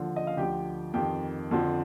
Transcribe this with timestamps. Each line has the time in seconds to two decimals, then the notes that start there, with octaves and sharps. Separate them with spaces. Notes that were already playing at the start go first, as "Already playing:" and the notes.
Already playing: D#2 D3 F3
0.16 D#5
0.27 F5
0.37 D2 D3 F3 G4 G5
0.94 F2 D#3 G4 G5
1.51 F2 D3 F3